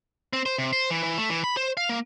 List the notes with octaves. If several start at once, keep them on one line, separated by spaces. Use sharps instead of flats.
C4
C5
C3
C5
E3
E3
A3
E3
B5
C5
F5
A#3